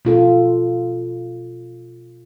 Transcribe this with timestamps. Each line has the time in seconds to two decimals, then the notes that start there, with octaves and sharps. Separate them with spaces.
0.05 B2 F4 A4